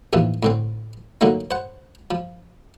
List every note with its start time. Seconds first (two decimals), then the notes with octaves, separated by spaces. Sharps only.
0.13 A1 D#2 E3 F3
0.43 A2 D3 C4
1.21 D3 F#3 A3 A#3 D#4
1.51 C5 F#5
2.11 F3